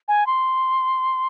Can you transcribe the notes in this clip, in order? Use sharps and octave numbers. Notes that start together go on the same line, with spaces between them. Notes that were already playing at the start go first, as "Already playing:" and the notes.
G#5
C6